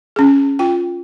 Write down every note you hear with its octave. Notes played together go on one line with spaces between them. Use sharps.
C#4 G#4
F4 G5